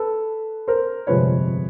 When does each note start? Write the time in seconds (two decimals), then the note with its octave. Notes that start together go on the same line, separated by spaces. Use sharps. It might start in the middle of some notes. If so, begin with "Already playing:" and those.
Already playing: A4 B4
0.68 A#4 C5
1.07 G1 F2 C3 F3 G#3 B4 C#5